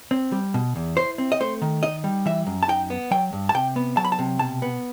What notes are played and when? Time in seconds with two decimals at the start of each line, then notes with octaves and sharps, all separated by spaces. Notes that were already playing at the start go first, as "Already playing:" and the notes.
0.11 C4
0.32 G3
0.54 B2
0.76 E2
0.97 E4 C5
1.18 C4
1.32 D#5
1.40 A3 C5
1.62 D#3
1.83 D#4 D#5
2.04 G3
2.26 E3 E5
2.47 F#2
2.63 A5
2.68 D#4 G5
2.90 B3
3.11 F#3 G5
3.33 G2
3.49 A5
3.55 C3 G5
3.76 B3
3.97 F#3 A5
4.05 B5
4.12 A5
4.19 C3
4.39 B2 A5
4.62 B3